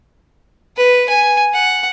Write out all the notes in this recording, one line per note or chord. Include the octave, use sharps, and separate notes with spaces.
B4
G#5
F#5